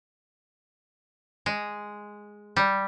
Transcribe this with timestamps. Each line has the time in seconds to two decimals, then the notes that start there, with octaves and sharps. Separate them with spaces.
1.46 G#3
2.56 G3